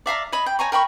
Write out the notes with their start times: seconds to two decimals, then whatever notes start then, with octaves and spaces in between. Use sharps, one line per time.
0.06 D5 E5 F5 A#5
0.32 C#5 D#5 B5
0.46 G5
0.59 C#5 G#5 A#5 C#6
0.72 A#4 G5 B5 C#6